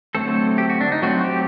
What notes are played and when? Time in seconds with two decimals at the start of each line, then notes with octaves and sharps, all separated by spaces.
0.15 D3 F#3 A3 C4 A4
0.58 G4
0.70 F#4
0.81 D4
0.92 D#4
1.02 F#3 A3 C4 F#4
1.24 G4